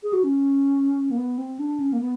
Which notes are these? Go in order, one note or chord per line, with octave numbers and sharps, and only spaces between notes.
G#4
F#4
C#4
A#3
B3
C4
D4
C#4
A#3
B3